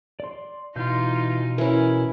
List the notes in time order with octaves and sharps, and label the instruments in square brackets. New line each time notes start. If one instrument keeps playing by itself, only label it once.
[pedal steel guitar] D5 C6
[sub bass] B2 [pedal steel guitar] E3 G6 [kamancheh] D#4 F4
[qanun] E3 C#4 [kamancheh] E4 [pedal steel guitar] A#4